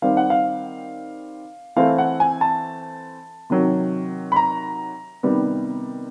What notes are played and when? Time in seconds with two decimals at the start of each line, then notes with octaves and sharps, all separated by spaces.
0.02 D#3 G3 C4 F5
0.17 F#5
0.30 F5
1.76 E3 A3 C4 F5
1.98 F#5
2.20 G#5
2.41 A5
3.50 C3 D#3 F#3
4.32 B5
4.36 A#5
5.23 C3 D#3 G3 B3